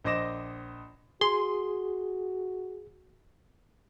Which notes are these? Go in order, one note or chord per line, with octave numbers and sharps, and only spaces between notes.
A#1 C5 D#5 D6 A#6 E7
F#4 G#4 C6